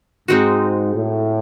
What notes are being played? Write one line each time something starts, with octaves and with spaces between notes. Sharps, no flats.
G#2 G#3 C4 D#4 F#4
A2